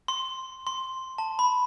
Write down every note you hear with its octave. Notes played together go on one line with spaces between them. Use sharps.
C6
C6
A5
B5